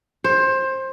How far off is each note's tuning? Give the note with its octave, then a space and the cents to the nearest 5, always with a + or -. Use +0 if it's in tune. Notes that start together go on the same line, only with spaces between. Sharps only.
C5 +20